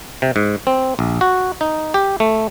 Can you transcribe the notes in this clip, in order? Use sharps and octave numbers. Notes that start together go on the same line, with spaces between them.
C3
G#2
C4
A#1
F#4
D#4
G4
A3